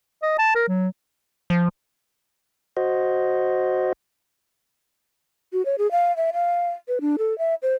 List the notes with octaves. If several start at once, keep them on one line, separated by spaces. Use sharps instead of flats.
D#5
A5
A#4
F#3
F3
F#4 C5 D#5
F#4
C#5
G#4
F5
E5
F5
B4
D4
A4
E5
C5